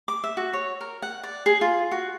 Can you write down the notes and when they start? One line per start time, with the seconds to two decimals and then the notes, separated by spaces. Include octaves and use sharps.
0.08 D6
0.24 E5
0.37 F#4
0.53 C#5
0.81 A#4
1.02 F#5
1.23 D5
1.46 G#4
1.61 F4
1.91 F#4